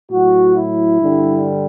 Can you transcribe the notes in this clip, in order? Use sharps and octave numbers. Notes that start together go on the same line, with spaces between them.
A2 F#3 F#4
E4
G2 D3 G3